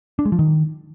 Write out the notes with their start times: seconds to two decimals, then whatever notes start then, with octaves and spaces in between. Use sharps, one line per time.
0.19 D4
0.25 G#3
0.32 F3
0.39 D#3